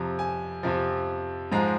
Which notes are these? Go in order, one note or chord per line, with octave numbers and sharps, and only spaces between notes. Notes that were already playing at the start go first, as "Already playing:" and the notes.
Already playing: F2 C3 F3 A#5
G#5
F2 C3 F3
G#2 F3 G#3 A#5